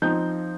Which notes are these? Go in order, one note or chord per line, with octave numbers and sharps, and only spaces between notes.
F3 C4 D#4 G6